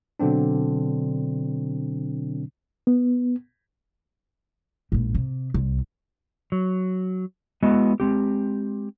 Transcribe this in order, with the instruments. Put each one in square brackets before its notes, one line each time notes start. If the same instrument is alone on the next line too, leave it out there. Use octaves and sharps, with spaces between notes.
[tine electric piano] B2 D3 F#3 C4 D4
[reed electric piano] B3
[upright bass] A#1 G#2
C3
C2
[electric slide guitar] F#3
G#3 B3 E4 F#4 D#5
G#3 C4 G4